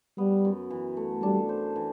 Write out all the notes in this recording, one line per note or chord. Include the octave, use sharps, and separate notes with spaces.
G3 B3
F#2
E3
A3
G3 D4
C5
E3